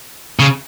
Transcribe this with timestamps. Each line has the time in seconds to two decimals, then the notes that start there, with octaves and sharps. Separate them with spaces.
0.39 C#3